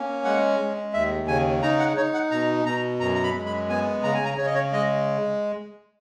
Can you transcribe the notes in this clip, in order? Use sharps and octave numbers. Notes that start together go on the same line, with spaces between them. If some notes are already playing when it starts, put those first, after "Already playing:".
Already playing: A#3 C#4
G#3 F#5
G#3
D#2 E5
C#3 G#5
D#4 A#5
F#5
D#4 C#5
F#5
B2 A#5
B2 A#5
F#2 A#5
A#5
B5
G#3
B5
B3 G#5
C#3 A#5
G#5
A#5
C#3 C#5
D#5
C#5
G#3 D#5